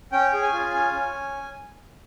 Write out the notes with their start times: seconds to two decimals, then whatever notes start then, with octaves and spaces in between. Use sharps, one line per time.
0.12 C#4 G5
0.33 G#4
0.43 G#5
0.52 F4
0.74 C#4
0.93 C#4